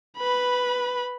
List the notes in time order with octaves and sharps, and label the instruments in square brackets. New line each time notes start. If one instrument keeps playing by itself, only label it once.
[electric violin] B4 B5